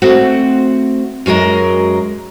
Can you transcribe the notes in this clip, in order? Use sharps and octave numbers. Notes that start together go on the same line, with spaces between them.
A3 C4 F#4 F#5
F#2 F#3 G#3 A#4